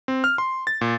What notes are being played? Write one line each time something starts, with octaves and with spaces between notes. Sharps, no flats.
C4
F6
C6
A6
A#2